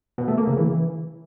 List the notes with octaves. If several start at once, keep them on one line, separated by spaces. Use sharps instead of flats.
B2
A3
A#3
C#3
E3